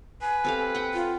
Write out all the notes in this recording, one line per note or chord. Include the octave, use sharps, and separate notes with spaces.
B4 G#5
C4 G4 A4 F5
F#5 G5
F4